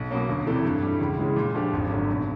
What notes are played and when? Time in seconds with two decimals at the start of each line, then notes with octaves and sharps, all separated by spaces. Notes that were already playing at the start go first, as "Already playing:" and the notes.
Already playing: B1
0.11 B2 F#3 A#3 C#4
0.29 D2
0.46 C3 E3 A3 D4
0.64 G2
0.82 E3 G3
1.00 C#2
1.19 C#3 E3 G#3
1.36 A#2
1.55 F3 A3 D4 G4
1.73 G#1
1.90 F#2 D3
2.08 B1